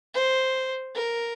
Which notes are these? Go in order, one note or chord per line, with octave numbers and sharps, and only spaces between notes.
C5
A#4